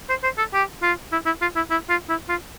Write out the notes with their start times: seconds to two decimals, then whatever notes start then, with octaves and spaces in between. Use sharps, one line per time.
0.09 C5
0.23 C5
0.38 A4
0.54 G4
0.83 F4
1.12 E4
1.26 E4
1.41 F4
1.56 E4
1.70 E4
1.89 F4
2.09 E4
2.29 F4